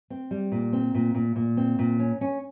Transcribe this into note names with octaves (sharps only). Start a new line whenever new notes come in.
C4
G3
A#2
C4
A#2
A#2
A#2
C4
A#2
C#4
C#4